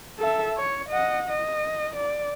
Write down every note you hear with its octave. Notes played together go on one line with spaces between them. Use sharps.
A4 E5
C#5
D#5 F#5
D#5
D5